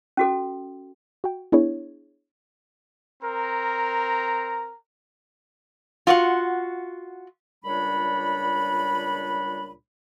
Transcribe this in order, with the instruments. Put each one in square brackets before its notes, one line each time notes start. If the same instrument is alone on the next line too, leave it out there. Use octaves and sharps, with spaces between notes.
[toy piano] C#4 F#4 A4
[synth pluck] F#4 G5
B3 D4 E4 G#4 C#5
[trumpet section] C4 A#4 [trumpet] A#5
[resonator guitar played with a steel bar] F4 F#4 C#5 F#5
[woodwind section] C#2 A#2 G3 D4 C#5 B5